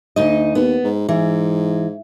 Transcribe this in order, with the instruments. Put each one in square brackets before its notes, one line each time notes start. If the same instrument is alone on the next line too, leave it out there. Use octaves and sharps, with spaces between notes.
[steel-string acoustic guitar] D2 D#4 D#5
[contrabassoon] D#2 [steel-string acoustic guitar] B3
[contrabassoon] G#2
[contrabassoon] G#2 [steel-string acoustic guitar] E3